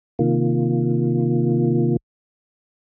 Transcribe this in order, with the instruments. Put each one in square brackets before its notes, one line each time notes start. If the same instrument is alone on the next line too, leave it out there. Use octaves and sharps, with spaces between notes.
[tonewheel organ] C3 D#3 A#3 F4